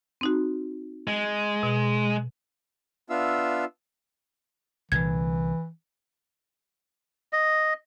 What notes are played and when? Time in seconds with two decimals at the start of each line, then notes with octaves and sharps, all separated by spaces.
0.21 C4 D#4 F#4
1.08 G#3
1.63 B2
3.10 B3 D4 F4 E5 F5 E6
4.92 C2 A#2 D3 E3 G#6
7.33 D#5